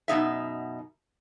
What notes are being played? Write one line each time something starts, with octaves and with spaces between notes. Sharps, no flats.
F#2 B2 D#4 E5